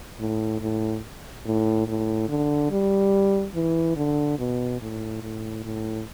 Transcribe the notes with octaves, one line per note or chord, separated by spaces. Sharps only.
A2
A2
A2
A2
D3
G3
E3
D3
B2
A2
A2
A2